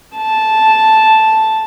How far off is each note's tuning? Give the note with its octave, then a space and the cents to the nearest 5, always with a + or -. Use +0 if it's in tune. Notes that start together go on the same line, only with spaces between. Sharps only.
A5 -5